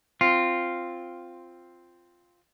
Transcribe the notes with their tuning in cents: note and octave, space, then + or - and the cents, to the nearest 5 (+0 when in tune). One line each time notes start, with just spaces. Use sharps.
C4 +0 F4 +0